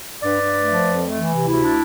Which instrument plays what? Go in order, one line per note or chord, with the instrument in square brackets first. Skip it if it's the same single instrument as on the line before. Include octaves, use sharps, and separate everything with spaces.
[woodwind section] G2 B4 D5
G2
A3
F3
F2
A3
E3
C3
D2 E4
D4